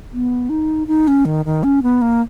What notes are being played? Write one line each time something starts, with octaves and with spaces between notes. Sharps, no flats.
B3
D#4
D#4
C#4
D#3
D#3
C#4
B3
A#3